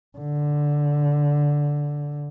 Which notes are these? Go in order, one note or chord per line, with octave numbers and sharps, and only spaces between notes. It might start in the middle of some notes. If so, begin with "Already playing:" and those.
D3